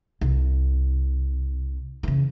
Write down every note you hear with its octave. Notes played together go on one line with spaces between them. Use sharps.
C2
C#3 E3